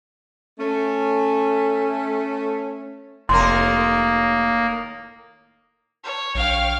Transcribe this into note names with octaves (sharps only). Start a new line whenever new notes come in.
A3 C#4
F1 A2 D#3 A#3 A#4 C6
C#5
A#1 F5 G5 F6